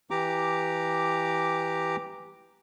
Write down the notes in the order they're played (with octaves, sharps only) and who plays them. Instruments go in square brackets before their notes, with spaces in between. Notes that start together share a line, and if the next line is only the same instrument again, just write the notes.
[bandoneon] E3 G4 A#5 D6